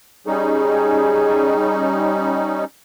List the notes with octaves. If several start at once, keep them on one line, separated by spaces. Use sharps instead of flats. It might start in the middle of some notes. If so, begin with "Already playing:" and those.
G3 C#4 D#4 G#4